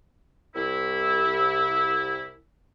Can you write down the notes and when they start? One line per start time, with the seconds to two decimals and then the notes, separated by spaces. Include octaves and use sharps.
0.55 C2 E4